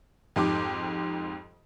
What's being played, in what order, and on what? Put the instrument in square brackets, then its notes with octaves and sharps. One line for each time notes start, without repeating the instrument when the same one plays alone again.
[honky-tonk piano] F2 G#2 G4 D6